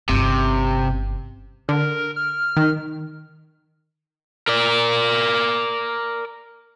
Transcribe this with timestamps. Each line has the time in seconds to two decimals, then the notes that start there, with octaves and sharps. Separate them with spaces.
0.09 G1 C3 C#4
1.69 D3 A#4
2.16 F6
2.57 D#3
4.48 A#4 D5